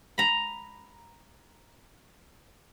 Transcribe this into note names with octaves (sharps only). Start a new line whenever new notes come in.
A#5 B5